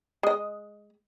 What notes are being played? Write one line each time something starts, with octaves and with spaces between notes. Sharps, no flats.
G#3 D#5